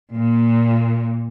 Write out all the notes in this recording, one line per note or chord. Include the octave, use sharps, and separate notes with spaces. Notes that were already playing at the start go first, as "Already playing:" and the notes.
A#2